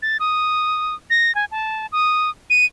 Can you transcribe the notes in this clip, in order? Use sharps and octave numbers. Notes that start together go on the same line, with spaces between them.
A6
D#6
A#6
G#5
A5
D#6
D#7